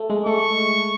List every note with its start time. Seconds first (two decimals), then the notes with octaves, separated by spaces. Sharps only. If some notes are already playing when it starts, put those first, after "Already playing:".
Already playing: A3
0.10 G#3
0.26 A3 C#6